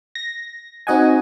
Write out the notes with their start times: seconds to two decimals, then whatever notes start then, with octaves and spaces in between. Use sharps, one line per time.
0.15 A#6
0.87 C4 D#4 F#4 D#5 F#5 G#5